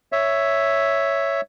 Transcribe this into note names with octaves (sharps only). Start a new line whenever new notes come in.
C#5 E5